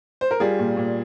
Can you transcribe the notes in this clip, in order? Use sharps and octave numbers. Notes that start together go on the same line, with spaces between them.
C5
A#4
G3 F4 G#4
A#2
A#2